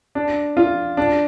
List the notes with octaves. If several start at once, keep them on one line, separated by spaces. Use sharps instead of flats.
D4
F4
D4